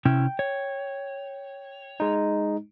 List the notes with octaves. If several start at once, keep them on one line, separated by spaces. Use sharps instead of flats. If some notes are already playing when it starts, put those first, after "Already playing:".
C3 C#4 E4 G5
C#5
G#3 D#4